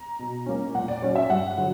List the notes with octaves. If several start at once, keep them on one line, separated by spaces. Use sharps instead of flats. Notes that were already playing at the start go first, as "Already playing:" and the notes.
Already playing: A#5
B2
A#3 C#4
A#2 F#5
D5
F#3 C#4 C#5
E5
G2 F#5
D3 F#3